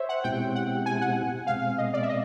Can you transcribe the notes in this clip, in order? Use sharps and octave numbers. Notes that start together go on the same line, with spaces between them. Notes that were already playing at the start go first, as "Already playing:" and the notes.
Already playing: C5 C#5 E5
F#5
B2 G#3 C4 E4 G4 G5
F#5
G#5
F#5
B2 G#3 C4 F5
D#5
D5
E5
D#5